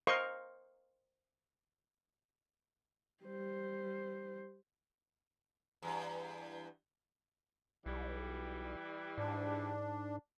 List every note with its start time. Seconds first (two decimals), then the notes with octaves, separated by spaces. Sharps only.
0.07 A#4 C5 D#5 F5 C6 C#6
3.24 G3 C5
5.82 E2 G2
7.86 B1 E3 G3
9.18 G#2 D4